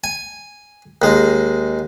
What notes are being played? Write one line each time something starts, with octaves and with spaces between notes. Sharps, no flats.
G#5
D#2 G#3